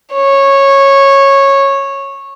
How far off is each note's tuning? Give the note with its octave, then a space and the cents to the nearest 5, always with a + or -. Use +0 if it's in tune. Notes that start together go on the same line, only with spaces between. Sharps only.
C#5 -15